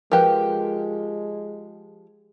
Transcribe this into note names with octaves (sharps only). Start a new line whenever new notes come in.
F3 G#3 G4 A#4 B4